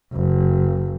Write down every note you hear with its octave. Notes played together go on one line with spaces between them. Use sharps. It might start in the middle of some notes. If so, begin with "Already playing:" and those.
F#1